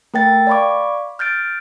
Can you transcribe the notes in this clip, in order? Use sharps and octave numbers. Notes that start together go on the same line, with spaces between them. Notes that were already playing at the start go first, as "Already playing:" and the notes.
A3 A#4 G5 A6
D5 F5 B5 C#6 D6
F6 G6 A6 D7